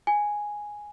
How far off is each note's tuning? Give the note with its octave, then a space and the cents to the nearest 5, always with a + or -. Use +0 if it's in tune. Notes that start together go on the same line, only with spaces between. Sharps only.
G#5 +0